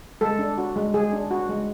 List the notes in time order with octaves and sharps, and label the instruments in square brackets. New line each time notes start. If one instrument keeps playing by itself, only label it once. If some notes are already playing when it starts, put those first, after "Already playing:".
[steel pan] G#3 A4
D4
F#4
G#3
G#3 G#4
D4
F#4
G#3